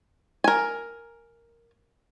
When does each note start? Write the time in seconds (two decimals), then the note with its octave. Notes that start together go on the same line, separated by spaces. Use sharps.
0.44 A#4 G#5